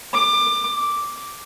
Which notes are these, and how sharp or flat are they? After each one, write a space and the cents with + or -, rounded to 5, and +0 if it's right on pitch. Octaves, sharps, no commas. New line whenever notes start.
D6 +25
D6 -5